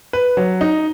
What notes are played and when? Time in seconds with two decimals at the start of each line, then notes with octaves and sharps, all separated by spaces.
0.13 B4
0.37 F#3
0.61 D#4